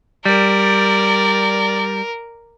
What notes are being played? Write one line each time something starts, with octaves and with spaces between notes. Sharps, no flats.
G3 A#4 D5